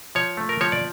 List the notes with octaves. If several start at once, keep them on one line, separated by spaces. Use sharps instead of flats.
F3 C#5
A3
A#4
F3 C#5
D5